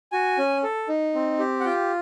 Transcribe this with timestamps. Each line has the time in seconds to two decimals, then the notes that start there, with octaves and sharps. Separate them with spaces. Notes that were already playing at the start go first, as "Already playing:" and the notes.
0.12 F#4 G#5
0.38 C#4
0.63 A4
0.88 D#4
1.15 C4
1.39 G4
1.60 F#5
1.65 F4 G5